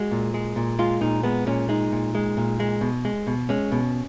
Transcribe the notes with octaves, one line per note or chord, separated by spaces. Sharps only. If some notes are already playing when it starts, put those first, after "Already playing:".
Already playing: G#3 F#4
A#2
G#3
A#2
G#3 F4
A#2 D#4
G#3 B3
A#2 C#4
G#3 D#4
A#2
G#3
A#2
G#3
B2
G#3
B2
G#3 C#4
B2